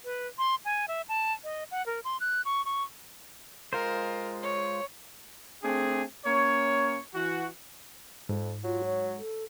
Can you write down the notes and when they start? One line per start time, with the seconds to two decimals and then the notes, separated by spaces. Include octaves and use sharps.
0.05 B4
0.38 C6
0.65 G#5
0.88 E5
1.09 A5
1.44 D#5
1.71 F#5
1.86 A#4
2.04 C6
2.20 F#6
2.45 C#6
2.65 C#6
3.73 G#3 F4 A#4 C5
4.43 C#5
5.62 A3 C4 D4 G#4
6.25 A#3 C#4 C#5
7.14 E3 F#4
8.29 F2 G#2
8.64 F#3 F4
8.84 C#5
9.18 A4